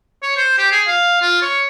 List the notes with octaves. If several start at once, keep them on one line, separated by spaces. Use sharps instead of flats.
C#5
C5
G4
G#4
F5
F4
C#5